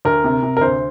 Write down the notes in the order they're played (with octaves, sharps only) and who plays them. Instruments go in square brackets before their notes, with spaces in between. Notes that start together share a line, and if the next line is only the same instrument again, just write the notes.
[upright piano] D2 A#4
C3
C3
A#4
D2 C5